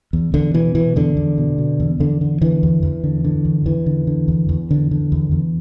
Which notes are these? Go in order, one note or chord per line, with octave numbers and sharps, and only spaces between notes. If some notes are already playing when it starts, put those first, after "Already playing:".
E2
E2 D3
B2 E3
B2 E3
E2 D3
E2
B2
B2
E2
E2 D3
D3
D3 E3
E2
E2
D3
D3
E2
E2 E3
D3
D3
E2
E2
D3
D3
E2
E2